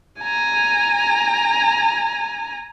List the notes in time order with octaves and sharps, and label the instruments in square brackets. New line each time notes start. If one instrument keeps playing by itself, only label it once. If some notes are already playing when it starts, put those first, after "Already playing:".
[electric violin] G#5 A#5